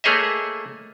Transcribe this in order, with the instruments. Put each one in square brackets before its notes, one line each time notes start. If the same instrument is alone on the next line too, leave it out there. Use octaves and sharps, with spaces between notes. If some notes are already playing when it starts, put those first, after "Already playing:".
[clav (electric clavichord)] A3 A#3 G#4 C#5 D#5 E5